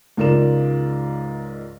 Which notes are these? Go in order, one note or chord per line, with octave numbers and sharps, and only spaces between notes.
C#2 G#2 F4 A#4 D5 E7